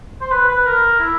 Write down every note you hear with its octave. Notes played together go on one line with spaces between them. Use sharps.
C5
B4
B4
A#4
E4